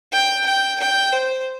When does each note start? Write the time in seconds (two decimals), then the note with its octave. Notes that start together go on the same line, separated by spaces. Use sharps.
0.12 G5
0.46 G5
0.80 G5
1.12 C5